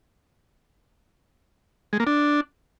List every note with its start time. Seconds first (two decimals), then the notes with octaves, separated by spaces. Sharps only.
1.93 G#3
2.00 A#3
2.07 D4